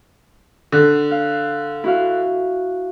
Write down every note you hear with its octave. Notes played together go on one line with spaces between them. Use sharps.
D3
F5
E4 F#4 F5